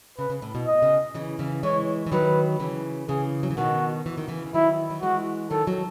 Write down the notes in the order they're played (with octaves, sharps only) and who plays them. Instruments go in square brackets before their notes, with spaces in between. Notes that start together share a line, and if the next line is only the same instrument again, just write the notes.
[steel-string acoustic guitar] C#3 [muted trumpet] B4
[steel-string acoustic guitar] C#3
A2
B2
[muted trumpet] D#5
[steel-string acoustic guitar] C#3
C#3 E3
C#3 E3
[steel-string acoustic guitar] E3 G#3 [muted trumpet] C#5
[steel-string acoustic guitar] E3
[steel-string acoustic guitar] D#3 F#3 [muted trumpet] B4
[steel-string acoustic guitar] C#3 E3
[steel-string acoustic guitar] C#3 E3 [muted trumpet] G#4
[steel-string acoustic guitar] F#3
E3
[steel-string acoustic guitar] B2 D#3 [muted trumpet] F#4
[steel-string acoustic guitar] E3
D#3
C#3 E3
E3
[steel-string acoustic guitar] D#3 F#3 [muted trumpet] E4
[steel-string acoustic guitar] F#3
[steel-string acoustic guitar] E3 G#3 [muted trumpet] F#4
[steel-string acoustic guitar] D#3 F#3 [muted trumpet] A4
[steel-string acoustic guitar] D#3 F#3